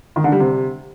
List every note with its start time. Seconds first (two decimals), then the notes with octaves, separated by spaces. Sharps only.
0.16 D#3
0.24 D3
0.32 G3
0.40 C3